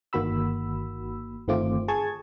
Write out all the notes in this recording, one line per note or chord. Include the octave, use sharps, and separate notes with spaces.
G1 D#3 A#3 F#4 B5 E6
G1 D#3 A3 C4 F4 D6
G#4 G#5 A5 C#6 G#6